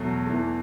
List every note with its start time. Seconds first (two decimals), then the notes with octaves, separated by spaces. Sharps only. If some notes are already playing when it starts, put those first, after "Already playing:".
Already playing: E2 B2 F#3 A3
0.27 E2 E3 A3